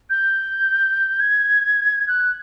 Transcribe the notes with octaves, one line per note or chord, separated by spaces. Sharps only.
G6
G#6
F#6